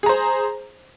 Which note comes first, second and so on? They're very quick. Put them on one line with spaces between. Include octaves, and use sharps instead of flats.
G#4 A#5 C5